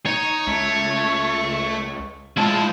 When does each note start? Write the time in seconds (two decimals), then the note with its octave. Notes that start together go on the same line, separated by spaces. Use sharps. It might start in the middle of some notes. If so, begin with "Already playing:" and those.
0.06 D#4 C#5
0.47 C#2 A3
2.37 F3 G#3 E4 A5